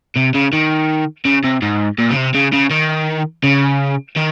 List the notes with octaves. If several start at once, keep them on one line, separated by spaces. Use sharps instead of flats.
C3
C#3
D#3
C#3
C3
G#2
A#2
C#3
C3
C#3
C#3
D#3
C#3
D#3